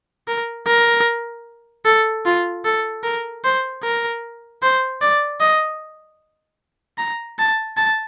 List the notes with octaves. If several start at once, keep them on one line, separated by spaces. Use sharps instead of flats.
A#4
A#4
A4
F4
A4
A#4
C5
A#4
C5
D5
D#5
A#5
A5
A5